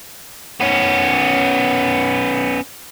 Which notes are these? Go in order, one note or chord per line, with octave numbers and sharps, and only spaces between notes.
B3 C#4